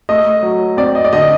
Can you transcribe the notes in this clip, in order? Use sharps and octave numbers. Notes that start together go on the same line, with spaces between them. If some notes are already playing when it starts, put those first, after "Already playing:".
A3 D#5
F#3
C4 D5
D#5
D5
D3 D#5